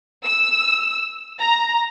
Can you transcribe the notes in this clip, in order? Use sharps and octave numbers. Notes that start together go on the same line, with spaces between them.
E6
A#5